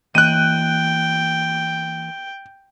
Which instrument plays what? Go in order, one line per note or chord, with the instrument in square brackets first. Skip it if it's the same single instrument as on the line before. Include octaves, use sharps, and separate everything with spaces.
[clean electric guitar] E3 A#3 D#5 [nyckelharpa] G5 [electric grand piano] F#6 D#7